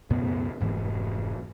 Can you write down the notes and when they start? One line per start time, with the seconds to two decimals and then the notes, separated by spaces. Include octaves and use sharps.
0.10 C#2 F#2 B2 B3
0.61 F1 G#2 E3